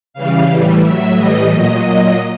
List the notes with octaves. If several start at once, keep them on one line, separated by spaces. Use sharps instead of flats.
C#3 E3 G3 F5
A2 E3 G3
A2 F#3 E5
A2 E3 G3 D#5
A#2 F#3 D#5
A#2 F#3